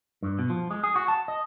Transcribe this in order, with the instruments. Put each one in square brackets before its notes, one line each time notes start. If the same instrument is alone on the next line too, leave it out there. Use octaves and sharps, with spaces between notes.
[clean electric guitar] G2
B2
F3
G#3
G#4
F#4
A5
D#5